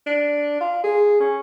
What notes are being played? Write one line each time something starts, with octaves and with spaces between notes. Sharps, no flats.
D4
F4
G#4
C#4